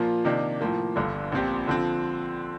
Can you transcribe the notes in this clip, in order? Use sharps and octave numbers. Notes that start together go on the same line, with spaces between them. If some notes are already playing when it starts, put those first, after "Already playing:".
Already playing: A#2 F3 A#3 F4
C3 D#3 A#3 D4
A2 F3 A#3
G1 G2 D3
A#1 A#2 F3 C4 G4
D3 F3 C4